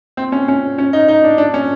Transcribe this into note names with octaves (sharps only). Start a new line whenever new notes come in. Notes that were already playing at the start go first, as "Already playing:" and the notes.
C4
C#4
C#4
C#4
D#4
D#4
D4
D4
C#4